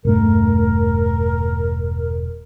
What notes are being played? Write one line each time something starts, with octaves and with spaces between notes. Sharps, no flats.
E1 G2 A3 A#4